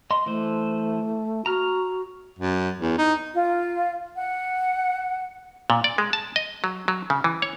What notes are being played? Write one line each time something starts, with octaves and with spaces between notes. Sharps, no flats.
D#5 C6
E3 A3 C5
F#4 A#5 F6
F#2
E2
D#4
F4
F#5
A#2
D5
G#3
A5
D#5
F#3
F#3
C#3
E3
C#5